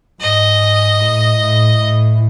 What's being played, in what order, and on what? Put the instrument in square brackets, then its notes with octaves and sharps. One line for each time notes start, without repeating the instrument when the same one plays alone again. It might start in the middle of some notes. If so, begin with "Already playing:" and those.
[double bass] G#2 [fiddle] D#5
[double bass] A2
A2
A2